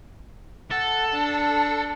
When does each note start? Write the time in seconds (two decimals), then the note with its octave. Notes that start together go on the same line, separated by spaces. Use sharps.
0.71 A4 F#5
1.12 D4